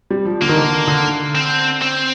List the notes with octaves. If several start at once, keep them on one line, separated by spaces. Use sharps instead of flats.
G3
F3
D3 A#3
D#3
D3
D3
C4
C4